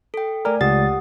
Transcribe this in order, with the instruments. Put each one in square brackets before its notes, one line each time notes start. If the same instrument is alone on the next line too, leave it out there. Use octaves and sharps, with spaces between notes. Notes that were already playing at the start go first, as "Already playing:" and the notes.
[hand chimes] A4 G5
[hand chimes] A3 D5 G#5 [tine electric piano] A#4
[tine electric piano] C#2 A6 [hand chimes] G4 F#5 D#6